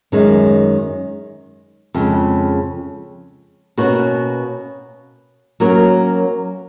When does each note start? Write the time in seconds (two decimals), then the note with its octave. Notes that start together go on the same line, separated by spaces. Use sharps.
0.12 F#2 D#3 G#3 C#4
1.95 F2 C#3 G#3
3.78 B2 A#3 C#4 F#4
5.60 F#3 A#3 C#4 F#4 A#4